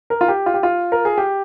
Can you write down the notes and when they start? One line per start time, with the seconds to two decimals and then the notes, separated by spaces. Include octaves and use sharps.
0.10 A#4
0.21 F4
0.28 G4
0.46 F4
0.54 G4
0.63 F4
0.92 A#4
1.05 G#4
1.18 G4